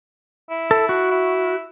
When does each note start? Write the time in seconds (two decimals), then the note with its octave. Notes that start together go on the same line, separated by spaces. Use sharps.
0.50 E4
0.71 A4
0.89 F#4
1.11 E4